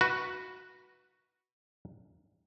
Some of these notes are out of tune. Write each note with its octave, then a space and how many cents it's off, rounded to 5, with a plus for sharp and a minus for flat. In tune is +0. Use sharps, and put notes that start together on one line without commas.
F#4 +0 B4 -5